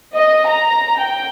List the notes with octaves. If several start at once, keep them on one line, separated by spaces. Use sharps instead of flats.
D#5
A#5
G5